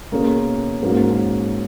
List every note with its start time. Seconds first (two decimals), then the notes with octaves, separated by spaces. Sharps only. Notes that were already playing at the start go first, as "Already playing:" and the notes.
0.12 B2 A#3 C#4 G#4
0.82 G#2 F#3 A#3 C#4